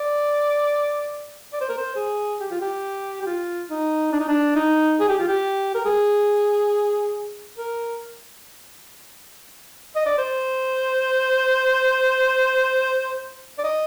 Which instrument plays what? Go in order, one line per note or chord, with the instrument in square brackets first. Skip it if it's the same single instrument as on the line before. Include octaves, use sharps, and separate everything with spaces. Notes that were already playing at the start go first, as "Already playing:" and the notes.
Already playing: [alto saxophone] D5
D5
C5
A#4
C5
G#4
G4
F4
G4
G4
F4
D#4
D4
D#4
D4
D#4
G#4
G4
F4
G4
A#4
G#4
A#4
D#5
D5
C5
D5
D#5